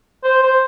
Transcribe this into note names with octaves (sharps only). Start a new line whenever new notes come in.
C5
C5